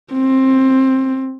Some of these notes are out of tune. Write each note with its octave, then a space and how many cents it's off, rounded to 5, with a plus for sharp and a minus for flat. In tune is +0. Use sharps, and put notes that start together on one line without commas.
C4 +15